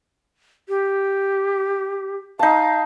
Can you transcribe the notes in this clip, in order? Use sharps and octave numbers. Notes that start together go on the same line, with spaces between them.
G4
D#4 F5 A5